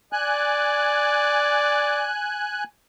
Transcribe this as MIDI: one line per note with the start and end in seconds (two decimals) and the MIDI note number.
0.13 2.08 74
0.13 2.64 80
0.13 2.64 90